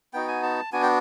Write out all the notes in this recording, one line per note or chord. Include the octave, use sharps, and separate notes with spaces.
B3 D#4 F#4 G5
G#5
A5
B3 D4 F#4 G#5
G5